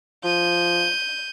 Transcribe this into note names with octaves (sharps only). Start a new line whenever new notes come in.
F3 G6 D#7